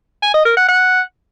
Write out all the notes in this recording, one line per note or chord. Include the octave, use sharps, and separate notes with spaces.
G#5
D#5
A#4
F#5
F#5